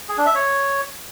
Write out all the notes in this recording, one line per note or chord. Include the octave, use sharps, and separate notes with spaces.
G#4
D4
E5
C#5